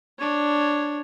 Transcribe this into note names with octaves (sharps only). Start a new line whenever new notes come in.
D4 C#5